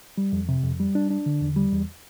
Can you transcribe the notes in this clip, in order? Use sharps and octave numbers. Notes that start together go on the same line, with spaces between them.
G3
F2
C3
F2
G3
D4
D4
D3
E2
G3
E2